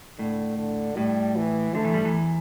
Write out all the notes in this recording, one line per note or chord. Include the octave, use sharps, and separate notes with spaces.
A2 D3
D3
A2 G3
E3
D2 D3 A3
E2 E3
G2 G3
E2 E3